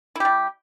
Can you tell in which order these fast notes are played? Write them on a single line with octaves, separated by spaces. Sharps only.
E4 G4 G3